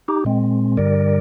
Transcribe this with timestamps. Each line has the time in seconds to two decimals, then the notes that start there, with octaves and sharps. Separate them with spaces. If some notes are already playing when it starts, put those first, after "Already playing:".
0.08 D#4 G4
0.25 A#2 G#3 C4
0.77 G2 D3 G3 A#4 D5